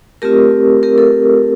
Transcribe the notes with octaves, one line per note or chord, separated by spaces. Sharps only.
A3 C4 F4 G4 A#4
G4 A#4
A4